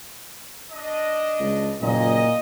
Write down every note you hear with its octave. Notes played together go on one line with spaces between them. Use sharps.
D4 D#5
C#2
F#1 A#2 D#5